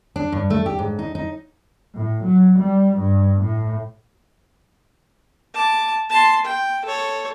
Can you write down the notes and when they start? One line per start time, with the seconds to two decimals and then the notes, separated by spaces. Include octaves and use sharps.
0.16 D4
0.32 G2
0.50 A3
0.66 G4
0.79 G#2
0.99 D#4
1.15 D#4
1.94 A2
2.23 F#3
2.58 G3
2.97 G2
3.41 A2
5.55 A5 D6
6.10 A5 C6
6.45 G5
6.85 A4 C#5